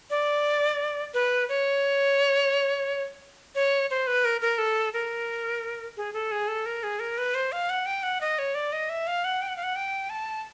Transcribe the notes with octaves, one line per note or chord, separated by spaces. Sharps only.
D5
B4
C#5
C#5
C5
B4
A#4
A#4
A4
A#4
G#4
A4
G#4
A4
A#4
G#4
A#4
B4
C5
F5
F#5
G5
F#5
D#5
C#5
D5
D#5
E5
F5
F#5
G5
F#5
F5
F#5
G5
A5